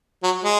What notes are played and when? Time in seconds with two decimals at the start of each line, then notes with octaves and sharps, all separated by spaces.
0.23 F#3
0.44 G#3